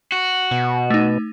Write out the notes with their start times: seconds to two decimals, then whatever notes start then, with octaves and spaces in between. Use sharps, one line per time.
0.12 F#4
0.51 B2
0.90 A3 D#4